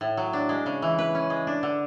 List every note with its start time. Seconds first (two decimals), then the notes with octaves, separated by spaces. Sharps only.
0.01 A2
0.17 F#3
0.33 D4
0.49 G#3
0.66 C#3
0.82 E3
0.99 B4
1.15 C#4
1.30 G#3
1.47 D4
1.63 D3